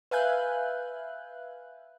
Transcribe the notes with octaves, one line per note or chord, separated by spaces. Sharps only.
B4 E5 F5 G#5 F#6 G6